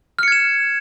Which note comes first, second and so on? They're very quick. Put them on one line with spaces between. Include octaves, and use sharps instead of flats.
F6 C#7 G#6 E7